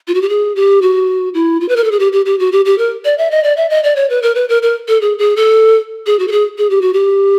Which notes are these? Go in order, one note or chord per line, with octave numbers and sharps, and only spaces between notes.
F4
F#4
G4
G#4
G4
F#4
E4
F4
B4
A#4
A4
G#4
G4
G4
G4
F#4
G4
G4
A#4
D5
E5
D#5
D5
E5
D#5
D5
C#5
B4
A#4
B4
A#4
A#4
A4
G#4
G#4
A4
G#4
F#4
A4
G#4
G#4
G4
F#4
G4